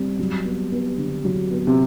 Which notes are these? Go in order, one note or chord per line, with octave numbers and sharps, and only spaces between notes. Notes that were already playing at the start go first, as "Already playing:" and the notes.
Already playing: G3 C4
F#3
B3
B3
D3
F#3
B3
C3